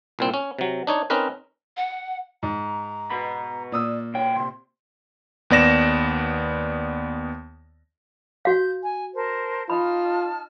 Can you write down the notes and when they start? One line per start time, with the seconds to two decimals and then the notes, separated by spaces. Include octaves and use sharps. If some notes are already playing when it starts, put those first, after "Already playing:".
0.19 C2 A#2 C4
0.34 C#4
0.59 C3 F#3
0.87 D4 D#4 C#5
1.10 C4 C#4 D#4 A#4 B4
1.77 F#5
2.43 G#2 A#5
3.10 B2 B3 B5
3.72 A#2 D5 D#6 E6
4.14 B2 C#5 G5
4.36 C#2 C3 C6
5.50 D#2 B3 D5 A#6 E7
8.45 F#4 F5 G6
8.82 G#5
9.15 A#4 C5 A5
9.70 D#4 F4 A5 B5 F6